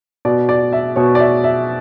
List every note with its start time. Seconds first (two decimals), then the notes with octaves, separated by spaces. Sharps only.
0.25 B2 D5
0.49 D5
0.73 E5
0.96 B2 C#5
1.15 D5
1.20 E5
1.44 E5